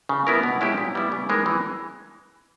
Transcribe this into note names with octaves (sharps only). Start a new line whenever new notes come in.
C#3
G3 B3 E4 A#4
B2
G#3 C#4 E4 G4
A#2
G3 B3 E4
C#3
E3 G#3 D#4 A#4
E3